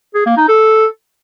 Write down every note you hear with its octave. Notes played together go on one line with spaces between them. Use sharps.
G#4
A#3
D#4
A4